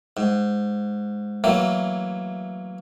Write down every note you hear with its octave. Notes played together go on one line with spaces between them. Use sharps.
G#2
E3 F#3 A3 A#3